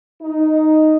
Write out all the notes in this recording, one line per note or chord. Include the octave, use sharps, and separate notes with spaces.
D#4